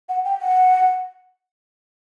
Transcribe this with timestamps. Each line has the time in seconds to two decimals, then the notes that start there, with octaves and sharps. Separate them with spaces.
0.09 F#5
0.25 G5
0.41 F#5